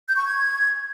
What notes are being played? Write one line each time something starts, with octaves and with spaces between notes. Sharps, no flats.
G6
C#6
G#6